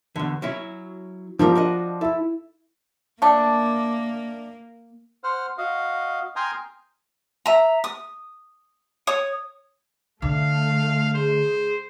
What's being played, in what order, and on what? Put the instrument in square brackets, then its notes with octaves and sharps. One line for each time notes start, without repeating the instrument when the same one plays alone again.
[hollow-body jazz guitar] E2 D3
F#3 C#4 E4
[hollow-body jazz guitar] G#2 G3 A#4 [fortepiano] F3
[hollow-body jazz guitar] D4 F#4 D#5
[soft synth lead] E4 [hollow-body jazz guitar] A4
[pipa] A3 D4 [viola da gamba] A#3
[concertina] C5 F#5 F6
F#4 D#5 F5
G5 G#5 A#5 C6 D#6 F6
[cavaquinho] E5 A#5
D#6
C#5 D#6
[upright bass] D3 [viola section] A3 [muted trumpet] F5
[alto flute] G#4 [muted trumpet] C5